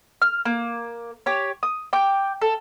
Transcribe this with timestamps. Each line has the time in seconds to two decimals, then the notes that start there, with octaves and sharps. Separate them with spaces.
0.22 F6
0.45 A#3
1.26 G4 C#5
1.63 D#6
1.93 G5 D6
2.42 A4